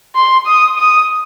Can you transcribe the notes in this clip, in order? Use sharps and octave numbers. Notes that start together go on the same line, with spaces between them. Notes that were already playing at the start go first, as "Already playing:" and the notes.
C6
D#6
D#6